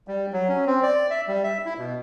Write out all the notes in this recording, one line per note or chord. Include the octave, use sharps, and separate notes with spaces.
G3
F#3
C#4
C4
D5
E5
G3
E5
E4
B2